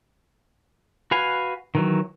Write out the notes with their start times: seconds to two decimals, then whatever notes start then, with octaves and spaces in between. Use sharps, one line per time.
1.11 F#4 B4 F5 G#5
1.75 D#3 E3 F#3